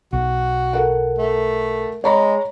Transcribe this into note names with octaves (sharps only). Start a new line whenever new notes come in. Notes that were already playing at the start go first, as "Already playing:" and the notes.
B1 F#4
A4 A#4 F#5
A3
G#3 C#5 A#5 B5